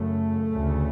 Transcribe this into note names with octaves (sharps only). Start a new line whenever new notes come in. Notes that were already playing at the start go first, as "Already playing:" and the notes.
Already playing: F#2 C#3 A3
D2 C#3